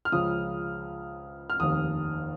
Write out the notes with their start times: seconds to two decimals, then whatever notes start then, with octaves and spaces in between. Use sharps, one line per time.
0.05 F6
0.12 C#2 C#3 F3 D#6
1.50 F6
1.60 F1 D#2 D#3 D#6